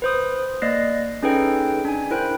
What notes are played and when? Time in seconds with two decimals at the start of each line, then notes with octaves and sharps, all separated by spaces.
0.02 B4 C5 D#6
0.62 A#3 D5 D#5 F#6 A#6 C7
1.23 C#4 D#4 G#4 A4 B4 G5
1.85 D4 G#5
2.11 E4 A#4 C5 G5 F#6